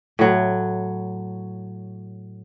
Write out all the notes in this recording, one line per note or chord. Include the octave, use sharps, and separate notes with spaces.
A2 F#3